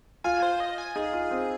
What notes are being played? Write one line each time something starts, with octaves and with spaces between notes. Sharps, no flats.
F4 G#5
C5
D#5
G#5
D#4 G#4
F4
C4